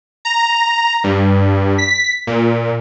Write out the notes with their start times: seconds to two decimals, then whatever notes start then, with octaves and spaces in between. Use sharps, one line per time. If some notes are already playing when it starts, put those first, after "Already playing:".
0.25 A#5
1.04 G2
1.78 B6
2.27 A#2